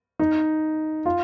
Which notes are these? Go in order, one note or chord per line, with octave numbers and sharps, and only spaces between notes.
D#4
F4